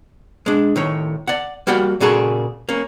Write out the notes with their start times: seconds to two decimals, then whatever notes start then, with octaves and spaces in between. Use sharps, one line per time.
0.46 G#3 D4
0.76 A2 D#3 C#5
1.27 D5 F#5
1.67 G3 A#3 F#4 D5 F#5 G5
2.00 A#2 C#3 A#3 F#4 G#4 A4
2.69 A#3 C#4